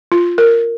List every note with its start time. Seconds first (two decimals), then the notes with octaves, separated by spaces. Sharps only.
0.12 F4
0.38 A#4